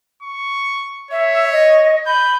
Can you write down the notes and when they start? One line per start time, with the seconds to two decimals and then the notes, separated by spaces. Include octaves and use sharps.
0.22 C#6
1.11 C#5 E5
1.52 D#5
2.06 B5 G6